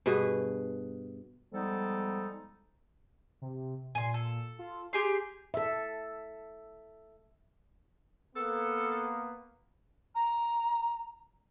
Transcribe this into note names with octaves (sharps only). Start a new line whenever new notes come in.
G2 B2 G#4 B4
F3 G3 G#3 B3 D#4 A4
C3
A#2 G#5 C6
A4
F4
G4 G#4 C6 G6
A4 E5
A#3 B3 A4
A#5